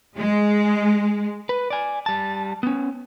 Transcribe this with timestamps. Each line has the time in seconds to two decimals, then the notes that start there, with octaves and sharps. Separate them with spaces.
0.18 G#3
1.49 B4
1.70 D5 G#5
2.06 G3 A5
2.63 B3 C#4